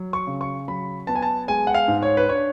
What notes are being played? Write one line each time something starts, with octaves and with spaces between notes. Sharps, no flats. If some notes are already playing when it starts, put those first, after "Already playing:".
Already playing: F#3
C#6
C#3
C#6
F#3 B5
B3 A5
G#5
A5
G#3 G#5
F#5
F5
G#2
C#5
B4
D4 C#5